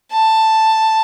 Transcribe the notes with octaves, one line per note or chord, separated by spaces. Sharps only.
A5